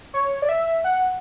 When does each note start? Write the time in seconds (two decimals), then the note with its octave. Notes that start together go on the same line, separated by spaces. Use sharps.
0.14 C#5
0.42 D5
0.49 E5
0.84 F#5